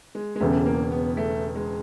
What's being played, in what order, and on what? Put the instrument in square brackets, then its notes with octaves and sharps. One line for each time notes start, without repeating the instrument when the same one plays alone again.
[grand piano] G#3
G#3
[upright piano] E1 E2 C#3 [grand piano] A3
[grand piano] A#3
B3
A3
G#3